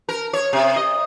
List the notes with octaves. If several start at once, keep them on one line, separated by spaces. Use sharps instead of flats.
A#4
C#5
C3
D#5